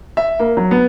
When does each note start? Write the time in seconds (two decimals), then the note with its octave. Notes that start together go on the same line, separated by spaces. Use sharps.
0.17 E5
0.40 A#3
0.57 F#3
0.71 B3